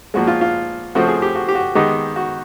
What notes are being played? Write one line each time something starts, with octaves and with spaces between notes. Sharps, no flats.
A#2 F3 G#3 F#4
F4
F4
C#3 F3 A3 C4 F#4
G#4
G4
F#4
G4
F#4
D#3 G#3 B3 D#4 G4
F#4